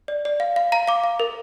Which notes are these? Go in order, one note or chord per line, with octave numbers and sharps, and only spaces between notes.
D5
D5
F5
F5
F5 A#5
F5 D6
F5
A#4